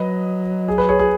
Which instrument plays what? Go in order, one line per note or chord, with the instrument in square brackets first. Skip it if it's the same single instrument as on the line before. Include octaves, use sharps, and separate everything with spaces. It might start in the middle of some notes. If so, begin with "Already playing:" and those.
Already playing: [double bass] F#3 [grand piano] B4 D#5
[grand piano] G#4
B4
G#4 C#5
G#4